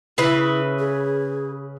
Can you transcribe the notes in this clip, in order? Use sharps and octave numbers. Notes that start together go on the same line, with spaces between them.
C#3 E4 B4 E5
G#4